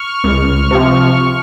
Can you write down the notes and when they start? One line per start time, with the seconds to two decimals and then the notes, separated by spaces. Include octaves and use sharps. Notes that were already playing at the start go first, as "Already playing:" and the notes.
Already playing: C#6 F6
0.24 C#2
0.71 C3 F3